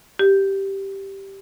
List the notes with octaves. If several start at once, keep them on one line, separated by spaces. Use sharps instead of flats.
G4